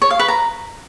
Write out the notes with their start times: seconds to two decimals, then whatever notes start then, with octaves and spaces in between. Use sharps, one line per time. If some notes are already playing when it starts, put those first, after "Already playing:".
0.02 C#5
0.11 F5
0.19 B4
0.28 A#5